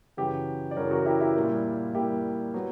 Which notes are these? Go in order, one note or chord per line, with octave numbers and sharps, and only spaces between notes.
F#2 C#3 E3 G4 B4
D5
F#2 C#3 E3 A#4 C#5
F#4 A#4
E4 G4
E4 G4
A#2 G3 A#3
A#2 G3 A#3 E4 G4
F#3 B3